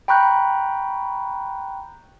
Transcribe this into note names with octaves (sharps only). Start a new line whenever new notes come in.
G5 A#5 B5 C#6 F#6 G6